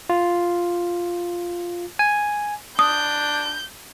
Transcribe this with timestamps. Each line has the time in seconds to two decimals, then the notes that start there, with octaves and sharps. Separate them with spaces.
0.10 F4
1.99 G#5
2.79 D4 D#6 G6